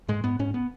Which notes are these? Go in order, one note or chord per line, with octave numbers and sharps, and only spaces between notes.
G#2 G#3
G#2 B3
G#2 C#4
B3